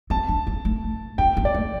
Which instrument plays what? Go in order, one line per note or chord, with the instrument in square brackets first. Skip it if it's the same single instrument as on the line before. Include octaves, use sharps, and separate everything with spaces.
[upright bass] C4 [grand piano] A5
[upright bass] D4
C4
A3
[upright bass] D4 [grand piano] G5
[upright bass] C4
[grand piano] D5
[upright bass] A3